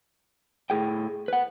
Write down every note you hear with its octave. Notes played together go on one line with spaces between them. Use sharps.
A2 G#4 G5
B4 F#5